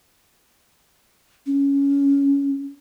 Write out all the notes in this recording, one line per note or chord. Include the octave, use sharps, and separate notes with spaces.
C#4